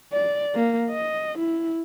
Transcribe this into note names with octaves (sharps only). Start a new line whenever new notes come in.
D5
A#3
D#5
E4